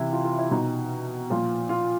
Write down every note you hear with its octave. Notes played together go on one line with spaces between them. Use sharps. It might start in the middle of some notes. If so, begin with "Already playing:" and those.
Already playing: C3 E3 E4
F4
F4
E4
B2 D#4
A#2 F3 F4
F4